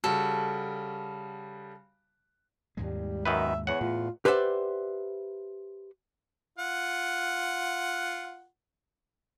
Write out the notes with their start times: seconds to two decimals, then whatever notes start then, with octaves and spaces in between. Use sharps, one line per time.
0.04 C#3 G3 F#4 A4
2.77 D#2 G#2 G3 G#3
3.26 F#2 D#3 B4 E5
3.67 E2 C#5 F#5
3.81 A2 F4
4.25 G4 B4 C5 D5 E5 F#5
6.58 F4 F#5